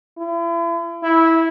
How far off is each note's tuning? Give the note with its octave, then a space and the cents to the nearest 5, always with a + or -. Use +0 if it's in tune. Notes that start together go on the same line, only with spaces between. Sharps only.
E4 +40
E4 -15